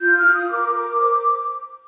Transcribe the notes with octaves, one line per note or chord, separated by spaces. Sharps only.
F4 G6
F6
F4
D#6
A#4 D6
A#4
C5